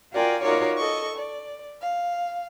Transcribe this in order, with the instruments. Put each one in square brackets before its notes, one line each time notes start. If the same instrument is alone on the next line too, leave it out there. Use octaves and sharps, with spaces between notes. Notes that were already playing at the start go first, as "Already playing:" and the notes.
[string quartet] F4 F#4 A#4 D5 G5 G#5
D#4 F4 F#4 A#4 C#5 D5
A4 D#5 C#6
D5
F5